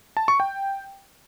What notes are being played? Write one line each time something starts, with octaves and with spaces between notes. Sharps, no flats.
A5
C#6
G5